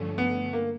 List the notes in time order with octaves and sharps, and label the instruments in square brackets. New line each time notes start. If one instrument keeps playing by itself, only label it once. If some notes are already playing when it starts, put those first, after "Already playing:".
Already playing: [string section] G2 D3 F3 A3 C#4
[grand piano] B3
A#3